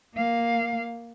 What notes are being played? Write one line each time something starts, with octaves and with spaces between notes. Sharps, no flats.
A#3 F5